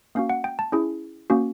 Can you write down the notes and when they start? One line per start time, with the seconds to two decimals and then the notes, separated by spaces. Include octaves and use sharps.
0.15 A#3 C#4 F#4 F5
0.30 F#5
0.44 G5
0.59 A5
0.72 C#4 E4 G#4
1.30 A#3 C#4 F#4